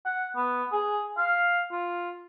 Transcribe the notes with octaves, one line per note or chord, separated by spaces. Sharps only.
F#5
B3
G#4
F5
F4